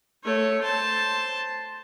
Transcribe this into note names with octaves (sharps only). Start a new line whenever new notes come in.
A3 C#5
C5 A5